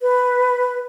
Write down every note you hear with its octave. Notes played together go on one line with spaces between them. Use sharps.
B4